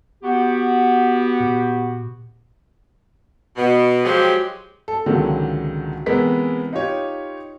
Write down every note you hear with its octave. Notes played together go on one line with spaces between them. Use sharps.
B3 F#4 G4
A#2
B2
F3 F#3 G#3 G4
A4
C#2 A#2 D3 D#3 F#3 G#3
C3 E3 G#3 B3 A#4 B6
D#4 F4 G4 C#5